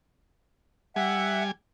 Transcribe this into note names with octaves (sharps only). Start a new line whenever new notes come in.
G3 E5 F#5 G#5